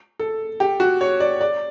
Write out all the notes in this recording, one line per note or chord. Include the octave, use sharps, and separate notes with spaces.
A4
G4
F#4
C#5
D5
D5